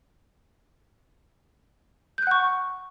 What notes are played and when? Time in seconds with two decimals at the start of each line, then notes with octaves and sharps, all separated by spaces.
2.18 G6
2.23 F#6
2.27 F#5
2.31 C#6